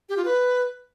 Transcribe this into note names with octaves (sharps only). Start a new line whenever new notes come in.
G4
F4
B4